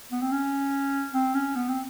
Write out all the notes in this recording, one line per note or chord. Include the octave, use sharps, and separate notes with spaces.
B3
C4
C#4
C4
C#4
B3
C4